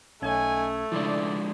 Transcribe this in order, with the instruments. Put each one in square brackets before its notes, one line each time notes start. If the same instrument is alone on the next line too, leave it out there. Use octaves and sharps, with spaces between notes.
[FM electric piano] B1 C#4 G#6 [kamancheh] A3 [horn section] D#4 G#5
[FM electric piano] C#3 E4 [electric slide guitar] F3 G#3 D4 [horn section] D5